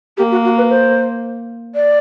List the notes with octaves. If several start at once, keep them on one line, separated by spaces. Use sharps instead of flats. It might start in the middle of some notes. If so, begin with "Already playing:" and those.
A#3 G4
F#4
F#4
B4
C5
D5